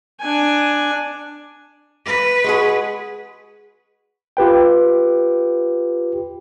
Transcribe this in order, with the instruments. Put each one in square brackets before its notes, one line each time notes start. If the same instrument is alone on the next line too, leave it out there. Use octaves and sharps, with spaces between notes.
[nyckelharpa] D4 G#5
[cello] B4
[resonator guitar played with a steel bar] G#3 F#4 G#4
[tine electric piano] F4 G4 B4 G5